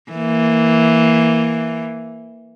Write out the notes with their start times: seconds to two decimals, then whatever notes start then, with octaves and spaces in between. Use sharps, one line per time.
0.11 E3 A#3